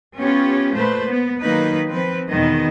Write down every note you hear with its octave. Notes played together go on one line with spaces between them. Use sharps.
B3 C#4 F4 G4 C#5
A#2 A3 B4 C5
B3
D#3 F#3 A#3 D#4 B4
F3 C4 B4
E2 B2 D#3 B3 D#5